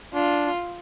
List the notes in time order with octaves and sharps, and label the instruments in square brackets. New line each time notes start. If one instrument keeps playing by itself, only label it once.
[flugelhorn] D4 [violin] F4